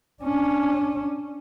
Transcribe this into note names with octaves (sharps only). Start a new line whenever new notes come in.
C#4 D4